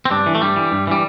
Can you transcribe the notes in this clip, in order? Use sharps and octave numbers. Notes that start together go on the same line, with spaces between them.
C4
G2 D4
E3
A3
G2 G3
E3
G2
E3 G3